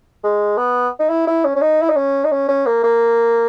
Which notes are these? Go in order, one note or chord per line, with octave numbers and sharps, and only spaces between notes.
G#3
B3
D#4
E4
E4
C#4
C#4
D#4
E4
D#4
C#4
D#4
C#4
C#4
A#3
A#3